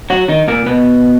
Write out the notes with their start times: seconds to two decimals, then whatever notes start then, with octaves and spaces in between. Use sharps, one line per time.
0.10 F#3 F#4
0.28 D#3 D#4
0.48 A#2 A#3
0.66 B2 B3